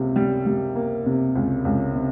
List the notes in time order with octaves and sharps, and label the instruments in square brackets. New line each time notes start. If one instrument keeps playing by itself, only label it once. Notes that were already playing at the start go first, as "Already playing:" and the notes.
Already playing: [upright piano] C#2 C3 A#3
G3
G3
A#3
C3
C#2
C#2
C3